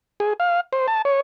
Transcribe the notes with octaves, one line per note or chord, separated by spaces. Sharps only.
G#4
F5
C5
A5
C#5